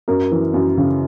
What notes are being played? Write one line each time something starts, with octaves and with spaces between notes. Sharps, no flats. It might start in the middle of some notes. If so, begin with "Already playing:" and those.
F#2 A#4
E3
F#2
C#3